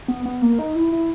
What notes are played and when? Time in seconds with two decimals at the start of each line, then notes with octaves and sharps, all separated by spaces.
0.08 B3
0.26 B3
0.41 A#3
0.59 D#4
0.75 E4
0.92 E4